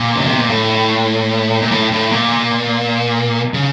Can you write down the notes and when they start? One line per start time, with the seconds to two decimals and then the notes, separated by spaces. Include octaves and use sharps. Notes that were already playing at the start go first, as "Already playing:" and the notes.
Already playing: A#2
0.16 C#3
0.27 C3
0.38 A#2
0.50 A2
1.62 A#2
1.71 A2
1.92 A2
2.12 A#2
3.54 C#3